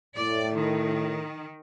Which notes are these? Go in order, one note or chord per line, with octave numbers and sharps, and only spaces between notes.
A2 D5
D#3